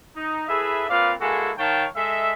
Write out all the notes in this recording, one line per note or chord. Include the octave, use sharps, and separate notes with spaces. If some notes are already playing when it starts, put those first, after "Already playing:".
D#4
E4 G#4 A4 B4 E5
A#2 C4 B4 D5 F5
G#3 A#3 E4 F#4 G#4 A4
D#3 C#5 F5 G5 A5
G#3 A4 D#5 E5